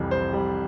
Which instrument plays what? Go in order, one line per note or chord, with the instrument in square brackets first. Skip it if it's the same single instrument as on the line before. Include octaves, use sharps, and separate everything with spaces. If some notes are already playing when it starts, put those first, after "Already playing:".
Already playing: [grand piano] C2 F2 E3 G3
G3 C5
G3